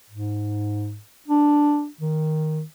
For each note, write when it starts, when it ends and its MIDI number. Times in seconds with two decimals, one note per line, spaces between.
0.10 0.98 44
1.28 1.87 62
2.01 2.62 51